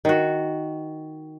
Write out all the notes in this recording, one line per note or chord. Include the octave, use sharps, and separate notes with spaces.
D#3 F#4